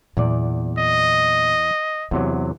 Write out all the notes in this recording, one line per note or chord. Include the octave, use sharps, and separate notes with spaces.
E2 A#2 F#3 D5
D#5
E2 C3 F#3 B3